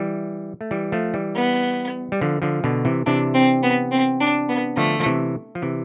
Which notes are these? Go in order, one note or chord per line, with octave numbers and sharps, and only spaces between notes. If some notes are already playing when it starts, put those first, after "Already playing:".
Already playing: E3 G3
A3
E3 G3
F3 A3
E3 G3
B3
G3
D3 F3
D3 F3
B2 D3
C3 E3
C3 E3 D4
C4
B3
C4
D4
B3
D3 F3 A3
F3
C3 E3
F3
C3 E3